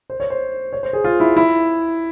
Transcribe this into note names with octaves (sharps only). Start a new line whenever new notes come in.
C5
C#5
C5
C#5
C5
G#4
F4
E4
E4